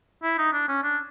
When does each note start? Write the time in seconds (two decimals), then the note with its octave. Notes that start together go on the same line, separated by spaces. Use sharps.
0.23 E4
0.38 D#4
0.53 D4
0.69 C#4
0.83 D4